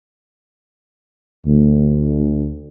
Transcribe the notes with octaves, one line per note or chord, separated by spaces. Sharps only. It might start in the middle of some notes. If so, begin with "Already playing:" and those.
D2